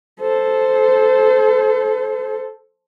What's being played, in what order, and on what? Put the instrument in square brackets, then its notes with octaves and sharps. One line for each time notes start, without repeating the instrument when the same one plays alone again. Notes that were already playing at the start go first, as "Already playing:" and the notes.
[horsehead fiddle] A4 C5